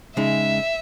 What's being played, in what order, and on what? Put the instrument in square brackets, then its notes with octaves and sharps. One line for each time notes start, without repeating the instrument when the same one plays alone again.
[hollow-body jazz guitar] C#3 G#3 D#4 [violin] E5